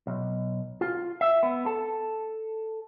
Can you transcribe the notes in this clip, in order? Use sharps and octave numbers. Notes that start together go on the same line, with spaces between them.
B1
F4
E5
B3
A4